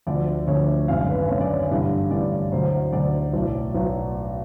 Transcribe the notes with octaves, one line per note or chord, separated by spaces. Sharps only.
D2 D3 F3 D5
D2 D3 F3 C#5
G#1 F#2 D3 F5
B4
G#1 F#2 D3 C#5
D5
C#5
A1 G2 D3
A1 G2 D3 D5
D2 D3 F#3 C5
D2 D3 F#3 D5
B1 A2 F#3
B1 A2 F#3